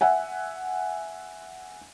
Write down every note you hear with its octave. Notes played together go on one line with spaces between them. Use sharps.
E5 F#5 G#5